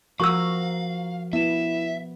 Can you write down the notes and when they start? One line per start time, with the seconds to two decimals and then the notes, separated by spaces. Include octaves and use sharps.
0.20 F3 F#4 A#4 F5 C#6 E6 F#7
1.33 B3 E4 E5 E7